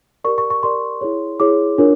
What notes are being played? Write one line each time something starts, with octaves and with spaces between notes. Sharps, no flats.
G4 A#4 D5 C#6
C#6
C#6
G4 A#4 D5 C6
E4 G#4 C#5
E4 G#4 C#5 D6
D4 F4 A#4 C#5